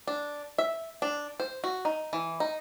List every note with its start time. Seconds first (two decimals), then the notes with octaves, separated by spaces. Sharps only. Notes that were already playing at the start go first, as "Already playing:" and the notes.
0.07 D4
0.58 E5
1.02 D4
1.40 C5
1.64 F#4
1.85 D#4
2.13 E3
2.40 D#4